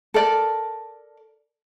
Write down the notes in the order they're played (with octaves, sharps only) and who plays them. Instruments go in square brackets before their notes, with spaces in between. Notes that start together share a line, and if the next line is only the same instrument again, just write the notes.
[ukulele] A4 A#4 D5